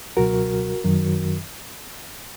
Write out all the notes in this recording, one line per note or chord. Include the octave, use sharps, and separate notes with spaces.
C#2 B2 F#3 F#4 A#4
F#2 D#3 F#3